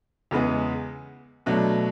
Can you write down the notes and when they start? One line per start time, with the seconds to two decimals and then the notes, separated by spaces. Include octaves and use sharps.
0.31 E2 C#3 G#3 B3
1.46 B2 F#3 A3 D4